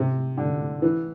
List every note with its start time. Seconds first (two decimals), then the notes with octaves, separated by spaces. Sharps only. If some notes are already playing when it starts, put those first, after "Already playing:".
Already playing: C3
0.37 D3
0.82 E3